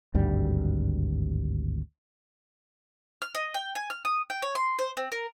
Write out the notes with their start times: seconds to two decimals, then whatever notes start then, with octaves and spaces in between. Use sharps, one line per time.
0.14 G#1 D2 G2 G3
3.22 F6
3.35 D#5
3.54 G5
3.75 G#5
3.90 F6
4.05 D#6
4.30 G5
4.42 C#5
4.55 C6
4.79 C5
4.97 C4
5.12 A#4